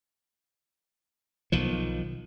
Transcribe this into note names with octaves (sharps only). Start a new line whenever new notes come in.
B1 D#3 F3